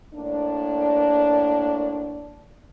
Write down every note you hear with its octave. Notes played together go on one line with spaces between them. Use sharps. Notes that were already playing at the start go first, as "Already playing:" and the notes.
A2 A#3 D4